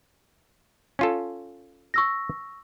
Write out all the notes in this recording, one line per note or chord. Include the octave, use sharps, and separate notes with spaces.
C#4 F4 A4
C#6 E6 A#6